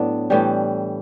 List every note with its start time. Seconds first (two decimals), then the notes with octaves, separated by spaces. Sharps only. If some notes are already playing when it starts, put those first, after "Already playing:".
Already playing: A2 F#3 B3 D4
0.30 A2 E3 G3